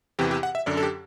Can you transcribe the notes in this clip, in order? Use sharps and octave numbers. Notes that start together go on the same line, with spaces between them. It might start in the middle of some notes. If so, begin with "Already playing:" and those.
E2 C3 E3 G4
G4
F#5
E5
F#2 D3 D5
A4
G4